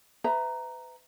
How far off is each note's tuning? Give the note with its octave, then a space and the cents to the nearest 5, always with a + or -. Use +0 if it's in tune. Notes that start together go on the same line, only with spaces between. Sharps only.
B4 +30 E5 +0 A#5 +0